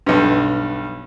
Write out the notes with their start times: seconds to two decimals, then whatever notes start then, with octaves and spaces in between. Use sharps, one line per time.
0.06 B1 G2